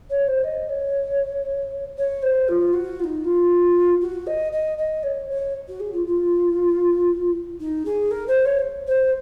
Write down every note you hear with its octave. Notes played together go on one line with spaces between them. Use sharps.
C#5
C5
D#5
C#5
C#5
C5
F4
F#4
F4
D#4
F4
F#4
D#5
D#5
D#5
C#5
C#5
F#4
G#4
F4
F4
D#4
G#4
A#4
C5
C#5
C5